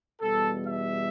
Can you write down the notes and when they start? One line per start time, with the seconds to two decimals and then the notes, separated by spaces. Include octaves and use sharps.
0.20 E2 B2 G3 A4
0.65 E5